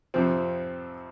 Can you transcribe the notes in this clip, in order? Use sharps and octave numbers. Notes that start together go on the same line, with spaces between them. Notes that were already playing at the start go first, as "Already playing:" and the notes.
F2 C3 F3 C4